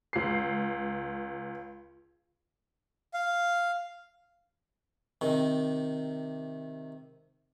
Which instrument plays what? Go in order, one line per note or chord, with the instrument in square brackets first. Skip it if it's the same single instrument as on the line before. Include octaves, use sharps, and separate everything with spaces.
[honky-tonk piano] C#2 C7
[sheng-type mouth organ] F5
[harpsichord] C3 D#3